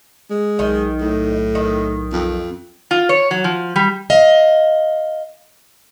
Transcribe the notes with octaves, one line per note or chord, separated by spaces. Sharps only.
G#3
B1 D#3
A2
D#3
F2
F4
C#5
F#3
F3
G3
D#5 F5